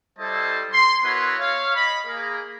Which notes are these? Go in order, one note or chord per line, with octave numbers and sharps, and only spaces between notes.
G3 E4 A4 C5 D#5 A5
C6
B3 E4 F#4 A#4 B4 C#5
C#5 F5
D#5 B5
A#3 G#4 A#4